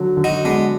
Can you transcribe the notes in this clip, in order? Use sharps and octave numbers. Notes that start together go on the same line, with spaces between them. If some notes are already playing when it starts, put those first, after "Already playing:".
Already playing: D3 F#3
D3
D#4 F#4
G#3 B3 D4